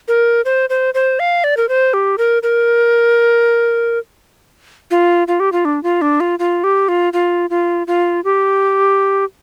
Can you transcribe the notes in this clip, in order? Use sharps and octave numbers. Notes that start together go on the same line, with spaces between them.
A#4
C5
C5
C5
F5
D5
A#4
C5
G4
A#4
A#4
F4
F4
G4
F4
D4
F4
D4
F4
F4
G4
F4
F4
F4
F4
G4